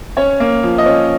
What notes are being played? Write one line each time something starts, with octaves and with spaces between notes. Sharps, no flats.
C#4 C#5
A#3
F3
D#5
C#4